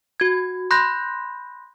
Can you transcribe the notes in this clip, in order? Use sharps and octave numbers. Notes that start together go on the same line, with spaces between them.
F#4 G#6
B5 C6 F#6 G6 A#6